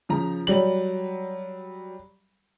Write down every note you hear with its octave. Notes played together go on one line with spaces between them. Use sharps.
C#3 F3 A#5
F#3 G3 F#7